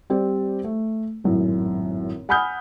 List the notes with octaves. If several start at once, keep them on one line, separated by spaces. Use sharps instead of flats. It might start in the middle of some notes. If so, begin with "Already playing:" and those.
G3 C4 G4 C5 D5
A3
G#1 F#2 A2
F#5 G#5 B5 D#6 F6 G6